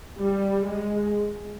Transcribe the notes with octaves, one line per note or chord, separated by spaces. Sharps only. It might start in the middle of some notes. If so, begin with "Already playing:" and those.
G3
G#3